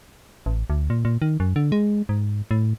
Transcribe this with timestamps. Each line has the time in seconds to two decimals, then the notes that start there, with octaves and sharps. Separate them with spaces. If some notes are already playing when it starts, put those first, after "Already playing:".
0.46 A1
0.70 D2
0.90 A#2
1.05 A#2
1.22 D#3
1.40 F#2
1.56 D3
1.72 G#3
2.09 G#2
2.51 A2